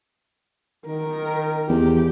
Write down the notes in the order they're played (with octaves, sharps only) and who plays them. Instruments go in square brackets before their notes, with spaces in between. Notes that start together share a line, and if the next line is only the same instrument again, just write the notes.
[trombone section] D#3 [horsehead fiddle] A#4
[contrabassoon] E2 [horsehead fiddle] G4